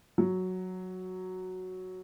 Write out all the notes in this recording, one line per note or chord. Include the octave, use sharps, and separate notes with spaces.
F#3